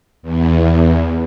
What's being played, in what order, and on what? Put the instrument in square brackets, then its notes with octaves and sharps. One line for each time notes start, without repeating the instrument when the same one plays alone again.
[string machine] E2